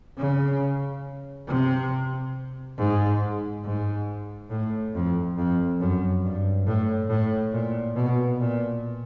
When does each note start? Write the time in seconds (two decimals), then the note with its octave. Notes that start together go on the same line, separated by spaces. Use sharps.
0.18 C#3
1.48 C3
2.78 G#2
3.64 G#2
4.50 A2
4.94 F2
5.37 F2
5.80 F#2
6.24 G2
6.67 A2
7.09 A2
7.53 A#2
7.96 B2
8.40 A#2